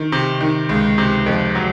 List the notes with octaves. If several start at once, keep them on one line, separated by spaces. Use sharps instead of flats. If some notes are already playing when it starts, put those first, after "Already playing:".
Already playing: D#3
C3
D#3
C#2
C3
F2
F#3